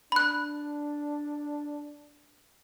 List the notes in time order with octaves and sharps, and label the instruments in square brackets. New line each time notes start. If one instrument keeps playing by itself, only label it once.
[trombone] D4 [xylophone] B5 F#6